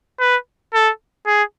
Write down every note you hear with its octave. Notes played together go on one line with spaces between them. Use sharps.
B4
A4
G#4